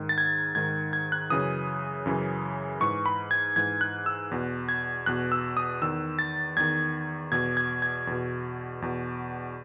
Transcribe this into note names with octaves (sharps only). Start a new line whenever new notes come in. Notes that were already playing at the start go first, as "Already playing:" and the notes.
Already playing: G#2 D#3
A6
G#6
G#2 D#3 G#6
G#6
F#6
F#2 C#3 E3 D#6
F#2 C#3 E3
G#2 E3 C#6
B5
G#6
G#2 E3 G#6
F#6
E6
E2 B2
G#6
E2 B2 F#6
E6
D#6
E2 D#3 E6
A6
E2 D#3 G#6
E2 B2 G#6
G#6
G#6
E2 B2
E2 B2